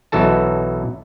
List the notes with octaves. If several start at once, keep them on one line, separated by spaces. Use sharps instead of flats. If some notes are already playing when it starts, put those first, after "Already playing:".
B1 E3 F#4 A4 A5